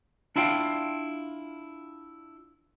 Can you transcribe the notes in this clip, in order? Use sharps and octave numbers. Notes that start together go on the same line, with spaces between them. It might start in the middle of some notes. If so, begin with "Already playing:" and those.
D4 E4 F4 F5 G5